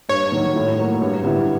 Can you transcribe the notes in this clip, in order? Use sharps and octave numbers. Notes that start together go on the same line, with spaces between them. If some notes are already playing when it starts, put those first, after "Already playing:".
G2 C#5
D#3 F#3
A2
F#3 A#3
G2
D3 G3 B3 E4